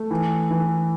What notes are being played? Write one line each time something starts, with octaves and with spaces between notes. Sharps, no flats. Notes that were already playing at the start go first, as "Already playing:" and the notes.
Already playing: A3
E3
E3